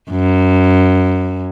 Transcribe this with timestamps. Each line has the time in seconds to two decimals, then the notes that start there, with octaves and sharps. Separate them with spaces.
0.11 F#2